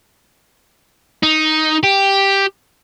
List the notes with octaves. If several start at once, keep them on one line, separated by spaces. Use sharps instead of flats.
D#4
G4